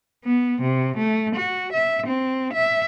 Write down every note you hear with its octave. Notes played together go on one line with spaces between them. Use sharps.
B3
C3
A3
F#4
E5
C4
E5